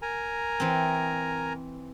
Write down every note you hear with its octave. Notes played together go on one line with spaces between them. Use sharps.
A#4 G#5 A#5
E3 C4